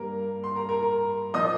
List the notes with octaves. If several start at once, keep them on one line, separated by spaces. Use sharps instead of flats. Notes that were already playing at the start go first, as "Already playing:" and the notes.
Already playing: G2 G3 A#3 A#4 A#5
C6
A#4 A#5
A#4 A#5
A#4 A#5
A#2 F3 A#3 D#5 D#6